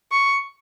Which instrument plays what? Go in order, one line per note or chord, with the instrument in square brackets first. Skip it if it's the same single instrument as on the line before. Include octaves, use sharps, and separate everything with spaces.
[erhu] C#6